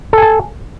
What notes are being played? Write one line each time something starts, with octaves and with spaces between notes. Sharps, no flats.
A4 G#5 A5